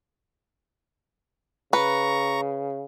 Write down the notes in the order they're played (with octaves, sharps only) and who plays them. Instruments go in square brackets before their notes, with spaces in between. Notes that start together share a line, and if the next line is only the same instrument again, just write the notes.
[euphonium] C#3 [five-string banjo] B4 [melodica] A#5 C#6